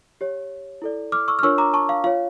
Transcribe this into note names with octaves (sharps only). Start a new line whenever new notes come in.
G4 C#5
E4 A4 D5
D6 F6
C#6 E6
F6
D4 F4 A#4 C#5 C#6 E6
A#5 D6
A5 C#6
F5
F4 C#5 F5